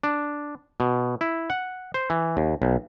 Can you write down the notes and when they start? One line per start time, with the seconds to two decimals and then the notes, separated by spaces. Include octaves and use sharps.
0.04 D4
0.80 B2
1.21 E4
1.50 F#5
1.94 C5
2.10 E3
2.37 D#2
2.62 B1